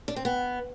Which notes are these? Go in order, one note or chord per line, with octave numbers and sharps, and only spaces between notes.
D4
C4
B3